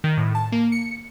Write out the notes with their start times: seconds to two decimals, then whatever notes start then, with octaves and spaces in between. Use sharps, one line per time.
0.04 D#3
0.17 A2
0.35 A5
0.52 A#3
0.72 C#7